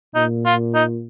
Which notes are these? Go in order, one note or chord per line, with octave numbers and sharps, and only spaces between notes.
A#2 D#4
F4
D#4